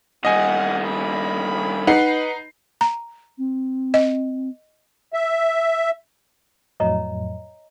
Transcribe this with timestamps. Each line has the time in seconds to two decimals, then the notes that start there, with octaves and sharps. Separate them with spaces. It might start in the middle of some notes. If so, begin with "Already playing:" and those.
0.25 G2 D#3 D#5 F#5 G#5
0.87 B5
1.87 D#4 B4 F#5 C7
2.81 A#5
3.38 C4
3.94 D#5
5.14 E5
6.80 F2 A2 F#3 C#5 D#5 A#5